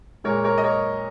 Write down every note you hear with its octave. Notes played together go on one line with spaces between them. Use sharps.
A#2 G#3 A#4 C#5
A#4 C#5
D#5
A#4 C#5